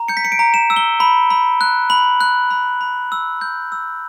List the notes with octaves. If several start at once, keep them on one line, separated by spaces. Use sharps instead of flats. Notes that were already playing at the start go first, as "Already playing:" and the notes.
Already playing: A#5
G6 C#7
B6
C#7
D7
A#5
E7
E6
G7
B5
B5
F#6
B5 F#7
F#6
B5
B5
E6
G6
E6